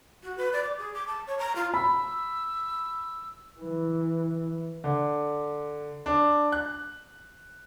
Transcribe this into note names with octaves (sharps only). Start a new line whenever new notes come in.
F#4
B4
D5
D6
G#4
D6
A5
C#5
A#5
F4
B5 E6
E3
D3
D4
F#6